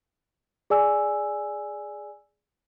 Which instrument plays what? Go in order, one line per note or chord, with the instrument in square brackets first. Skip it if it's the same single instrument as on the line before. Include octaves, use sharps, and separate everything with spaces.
[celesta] G#4 D5 G#5 E6